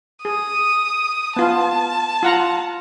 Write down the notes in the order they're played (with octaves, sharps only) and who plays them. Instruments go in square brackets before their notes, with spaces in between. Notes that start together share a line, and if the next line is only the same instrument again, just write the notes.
[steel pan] G#4 [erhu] D#6
[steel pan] B3 F4 [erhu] A5
[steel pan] F4 F#5 A#5